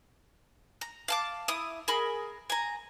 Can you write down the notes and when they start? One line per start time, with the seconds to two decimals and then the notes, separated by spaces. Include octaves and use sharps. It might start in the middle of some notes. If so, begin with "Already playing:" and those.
0.81 A#5
1.08 F5 A5 D6
1.48 E4 D#6
1.88 G#4 A#4 B5
2.50 G#5 A#5